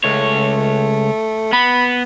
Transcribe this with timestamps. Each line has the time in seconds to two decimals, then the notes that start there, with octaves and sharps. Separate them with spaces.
0.04 C#2 A3 C#5
1.52 B3 B5